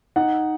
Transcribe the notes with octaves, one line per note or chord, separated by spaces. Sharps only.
D#4 F#5